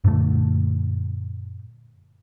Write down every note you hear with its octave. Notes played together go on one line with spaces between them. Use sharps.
F#2 A#2 D3 A3